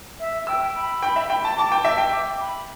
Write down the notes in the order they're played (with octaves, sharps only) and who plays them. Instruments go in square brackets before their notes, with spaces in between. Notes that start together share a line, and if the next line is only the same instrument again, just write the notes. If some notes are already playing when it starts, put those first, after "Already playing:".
[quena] E5
[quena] G5 [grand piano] E6
[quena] B5
[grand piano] G5
E5
G5
A5
[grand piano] A5 [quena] D6
[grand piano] G5
E5
G5
[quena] D6
B5